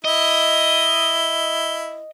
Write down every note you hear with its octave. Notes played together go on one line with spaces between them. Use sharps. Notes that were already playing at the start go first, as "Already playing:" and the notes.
E4 D#5 G7